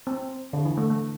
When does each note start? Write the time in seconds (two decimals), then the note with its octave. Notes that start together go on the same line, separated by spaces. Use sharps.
0.07 C4
0.53 D3
0.65 E3
0.77 A3
0.90 A3